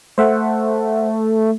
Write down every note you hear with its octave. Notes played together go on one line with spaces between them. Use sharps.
A3 C5 E5 F#5